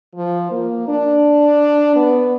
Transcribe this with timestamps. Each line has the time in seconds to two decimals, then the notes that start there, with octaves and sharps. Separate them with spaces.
0.15 F3
0.51 A#3
0.88 D4
1.96 B3